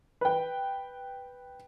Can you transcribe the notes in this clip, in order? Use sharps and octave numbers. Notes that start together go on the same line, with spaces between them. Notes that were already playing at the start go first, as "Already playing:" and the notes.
B4 G5